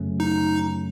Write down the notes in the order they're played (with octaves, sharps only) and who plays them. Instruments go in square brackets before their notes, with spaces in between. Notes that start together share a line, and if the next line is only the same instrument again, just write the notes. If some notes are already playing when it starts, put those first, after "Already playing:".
Already playing: [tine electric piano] F#2 C#3 F#3 A3 C#4
[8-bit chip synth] D#4